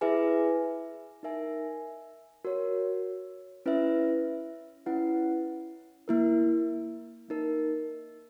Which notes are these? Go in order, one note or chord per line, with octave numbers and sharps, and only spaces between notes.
E4 G#4 B4 E5 G#5
D#4 A#4 E5 G#5
F#4 A#4 C#5
C#4 E4 B4 E5
C#4 E4 B4 F#5
A#3 E4 A#4
A#3 D#4 A#4